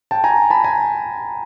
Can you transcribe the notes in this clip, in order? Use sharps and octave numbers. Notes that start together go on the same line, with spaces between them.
G5 A5
G#5 A#5
A5 B5
G#5 A#5